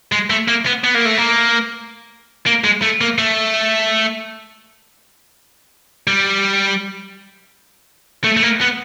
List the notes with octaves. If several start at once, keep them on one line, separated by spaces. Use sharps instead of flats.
G#3
A3
A#3
B3
B3
A#3
A3
A#3
A#3
G#3
A3
A#3
A3
G3
A3
A3
A#3
B3